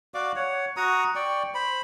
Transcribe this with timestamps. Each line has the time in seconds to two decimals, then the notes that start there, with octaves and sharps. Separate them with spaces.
0.14 F#4 D5 F5 D6
0.36 C#5 F#5
0.77 F#4 A#5 C#6 D#6
1.16 D5 G5 C#6
1.54 C5 B5